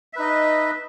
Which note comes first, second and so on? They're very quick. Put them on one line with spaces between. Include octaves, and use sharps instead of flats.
E5 B4 D#4 D#5